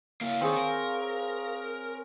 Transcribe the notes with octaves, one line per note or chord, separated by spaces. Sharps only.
A#3 E4 F5
D#3 C4 G#4 C#5
A#4